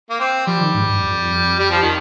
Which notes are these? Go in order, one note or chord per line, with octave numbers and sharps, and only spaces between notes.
A#3
C4
F3 G3
D#3
G#2
G2
F2
G3
F3
D#3